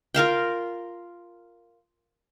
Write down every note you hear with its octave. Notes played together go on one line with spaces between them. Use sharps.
F4 A#4 F5 G5